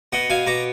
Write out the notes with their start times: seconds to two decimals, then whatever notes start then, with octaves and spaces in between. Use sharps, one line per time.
0.12 B2 D#5 F#5
0.30 B2 F5 G#5
0.47 B2 A#5 D6